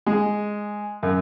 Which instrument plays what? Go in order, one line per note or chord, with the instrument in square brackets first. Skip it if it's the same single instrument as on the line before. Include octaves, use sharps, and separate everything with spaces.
[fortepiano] G#3
F#2